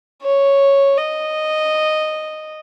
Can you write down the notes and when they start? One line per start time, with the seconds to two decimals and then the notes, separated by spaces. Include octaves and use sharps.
0.22 C#5
0.97 D#5